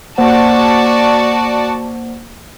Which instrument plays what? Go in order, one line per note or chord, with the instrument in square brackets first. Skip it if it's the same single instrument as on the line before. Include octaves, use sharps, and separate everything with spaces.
[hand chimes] A#3 C5 F#5 [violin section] F#4 D5 A5